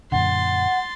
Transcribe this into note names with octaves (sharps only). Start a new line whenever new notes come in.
F#2 A#2 D3 F#5 C6 A6